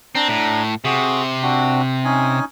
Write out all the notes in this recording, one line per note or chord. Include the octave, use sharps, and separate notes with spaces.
C4 D4 A#5
A2
C3 F#4 G#4
C4 D4 F#4
C#4 D#4 G#5